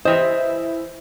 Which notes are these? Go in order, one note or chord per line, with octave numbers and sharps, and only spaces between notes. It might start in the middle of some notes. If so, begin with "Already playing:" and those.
E3 E4 C5 D#5 E5